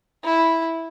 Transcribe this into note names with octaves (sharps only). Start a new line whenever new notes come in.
E4